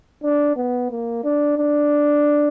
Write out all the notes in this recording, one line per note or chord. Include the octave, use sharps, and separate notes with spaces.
D4
B3
A#3
D4
D4